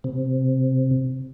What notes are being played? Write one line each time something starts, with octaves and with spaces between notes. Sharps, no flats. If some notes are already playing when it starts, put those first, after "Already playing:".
C3